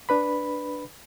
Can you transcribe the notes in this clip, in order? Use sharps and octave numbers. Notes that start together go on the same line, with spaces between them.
D4 B4 B5